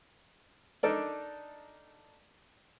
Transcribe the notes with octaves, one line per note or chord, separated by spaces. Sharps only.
D4 D#4 A4 A#4 D5